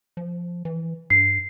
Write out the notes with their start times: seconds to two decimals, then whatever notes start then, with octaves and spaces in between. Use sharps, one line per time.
0.17 F3
0.65 E3
1.10 G2 C7